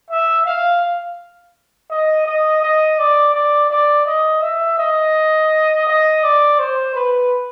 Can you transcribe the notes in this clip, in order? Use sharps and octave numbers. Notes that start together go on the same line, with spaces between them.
E5
F5
D#5
D#5
D#5
D5
D5
D5
D#5
E5
D#5
D#5
D5
C5
B4